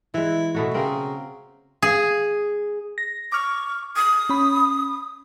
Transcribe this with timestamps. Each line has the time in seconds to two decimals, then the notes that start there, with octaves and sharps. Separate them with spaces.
0.14 E3 G#3 E4
0.55 B2 A3 F#4
0.74 C#3 C4 A#4
1.82 G#4
2.98 A#6
3.32 C#6 D6 F6
3.96 D#6
4.29 C#4 B5